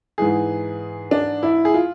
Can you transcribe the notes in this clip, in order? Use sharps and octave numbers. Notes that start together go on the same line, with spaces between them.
G#2 E3 G#4
D4
E4
G#4
F4